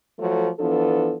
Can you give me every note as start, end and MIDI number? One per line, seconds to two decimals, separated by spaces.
0.19 0.49 53
0.19 0.49 54
0.19 0.49 57
0.59 1.16 52
0.59 1.16 53
0.59 1.16 59
0.59 1.16 62
0.59 1.16 69